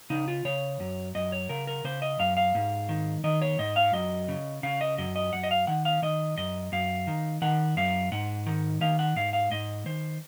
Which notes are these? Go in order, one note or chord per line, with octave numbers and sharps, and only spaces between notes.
C#3 D#4
F4
C#3 C#5
F#2
F#2 D#5
C#5
C#3 A#4
A#4
C#3 C5
D#5
F#2 F5
F5
G#2
D#3
D#3 D#5
C#5
G#2 D#5
F5
F#2 D#5
C#3
C#3 F5
D#5
F#2 D#5
D#5
F#2 F#5
D#5
F5
D#3 F#5
F5
D#3 D#5
F#2 D#5
F#2 F5
D#3
D#3 F#5
F#2 F5
G#2 F#5
D#3
D#3 F5
F#5
G#2 F5
F5
G#2 D#5
D#3 C5